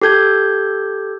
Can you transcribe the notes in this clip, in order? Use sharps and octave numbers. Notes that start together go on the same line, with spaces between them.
G4 A4 G6 G#6